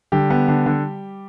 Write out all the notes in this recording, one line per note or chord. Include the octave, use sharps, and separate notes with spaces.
D3 G3 G4
B3
D3
D3